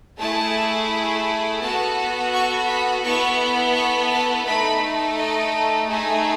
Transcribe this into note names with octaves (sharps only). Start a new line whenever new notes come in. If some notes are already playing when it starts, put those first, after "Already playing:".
A3 E4 G#4 A5
B3 F#4 A4 A5
C#6
B5
B3 E4 A4 C#6
C#6
A5
A3 D#4 A4 B5
D#5
A3 D#4 G#4